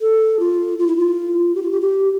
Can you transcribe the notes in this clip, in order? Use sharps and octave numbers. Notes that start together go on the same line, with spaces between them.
A4
F4
F4
E4
F4
G4
F4
G4
G4